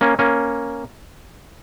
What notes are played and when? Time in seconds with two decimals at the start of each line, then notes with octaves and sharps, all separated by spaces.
0.01 A#3 C#4
0.19 A#3 C#4